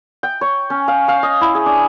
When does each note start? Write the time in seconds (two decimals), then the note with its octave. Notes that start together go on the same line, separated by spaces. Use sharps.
0.23 G5
0.41 C#5
0.70 C#4
0.88 F5
1.08 F5
1.23 D#5
1.41 E4
1.55 G#4
1.66 D4